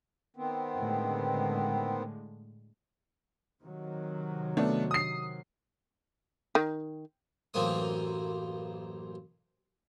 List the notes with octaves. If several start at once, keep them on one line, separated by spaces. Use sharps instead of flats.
D#3 B3 C4
A2 D3 G#3
C3 D#3 F#3
A3 B3 D4
D#6 C7
D#3
A1 F#2 E3 A#3 C4 D#6